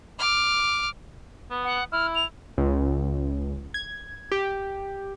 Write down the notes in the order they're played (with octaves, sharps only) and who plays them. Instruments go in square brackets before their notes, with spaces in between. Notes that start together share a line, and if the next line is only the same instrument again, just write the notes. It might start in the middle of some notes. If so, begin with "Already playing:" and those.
[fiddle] D6 F6
[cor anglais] B3
[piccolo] F#5
[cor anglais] E4 [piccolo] F6
[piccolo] F7
[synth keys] C#2
G#6
G4